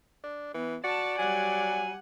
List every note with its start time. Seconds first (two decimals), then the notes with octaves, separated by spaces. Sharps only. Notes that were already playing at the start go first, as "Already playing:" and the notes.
0.24 D4
0.54 E3 B3
0.84 F#4 D5 A5
1.18 F#3 G3 F#5 G#5